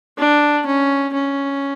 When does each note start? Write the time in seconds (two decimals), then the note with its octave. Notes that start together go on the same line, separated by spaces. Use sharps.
0.18 D4
0.66 C#4
1.13 C#4